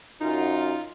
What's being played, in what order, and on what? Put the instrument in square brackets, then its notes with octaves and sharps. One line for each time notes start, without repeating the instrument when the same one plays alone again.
[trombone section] F#2 [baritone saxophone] D#4 [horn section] F4